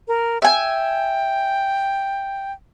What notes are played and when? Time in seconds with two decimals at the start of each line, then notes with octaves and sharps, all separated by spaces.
0.08 A#4
0.42 E5 G5 G#5